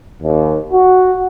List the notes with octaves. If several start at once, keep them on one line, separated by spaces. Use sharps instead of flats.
D#2
F#4